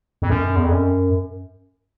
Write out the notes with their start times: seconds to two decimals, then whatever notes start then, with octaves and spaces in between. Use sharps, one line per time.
0.22 F2
0.30 F#2
0.56 E2
0.64 F2
0.72 F#2